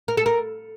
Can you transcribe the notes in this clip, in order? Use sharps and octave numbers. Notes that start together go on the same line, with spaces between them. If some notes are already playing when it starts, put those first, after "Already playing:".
A#4
A4
A#4